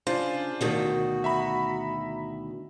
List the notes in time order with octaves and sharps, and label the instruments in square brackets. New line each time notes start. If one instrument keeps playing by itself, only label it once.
[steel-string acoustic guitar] C#3 [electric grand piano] D4 F4 C5
[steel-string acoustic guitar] D2 B2 D#3 [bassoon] F#4
[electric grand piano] E5 A#5 B5